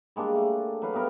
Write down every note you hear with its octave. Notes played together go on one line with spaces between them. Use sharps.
G3 G#3 A#3 D4
A3
F#3 B4 F5
G3 A3 B3 A#4